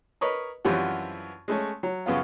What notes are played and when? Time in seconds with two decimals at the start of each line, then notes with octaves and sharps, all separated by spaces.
0.21 A#4 B4 C#5 D#5 A#5
0.65 F#2 E3 F3 G3 C4 F#4
1.48 G#3 A3 C#4
1.83 F#3
2.06 F#2 C#3 B3 F4